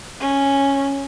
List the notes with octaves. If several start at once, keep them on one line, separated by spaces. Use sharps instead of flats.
C#4